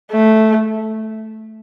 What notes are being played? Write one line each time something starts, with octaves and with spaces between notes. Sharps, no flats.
A3